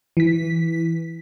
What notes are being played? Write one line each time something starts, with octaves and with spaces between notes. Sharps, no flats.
E3 B6